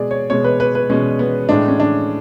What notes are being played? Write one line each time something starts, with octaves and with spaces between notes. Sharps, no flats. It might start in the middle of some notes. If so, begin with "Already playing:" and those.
Already playing: B2 G#3 G#4 D5
C#5
B2 G#3 C#5
B4
B4
B4
B2 G#3 C#4
B3
A2 G#3 D4
C#4
D4